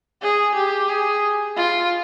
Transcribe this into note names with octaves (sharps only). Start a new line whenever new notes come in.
G#4
G4
G#4
F4